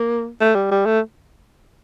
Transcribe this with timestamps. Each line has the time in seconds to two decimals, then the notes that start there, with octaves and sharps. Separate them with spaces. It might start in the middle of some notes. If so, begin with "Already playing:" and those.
Already playing: A#3
0.40 A3
0.55 G3
0.71 G3
0.86 A3